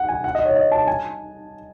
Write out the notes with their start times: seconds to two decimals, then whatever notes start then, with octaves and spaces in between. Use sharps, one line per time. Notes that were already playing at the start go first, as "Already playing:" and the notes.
Already playing: F#5
0.08 G#5
0.24 F#5
0.35 D#5
0.45 C#5
0.56 D#5
0.72 A5
0.87 G#5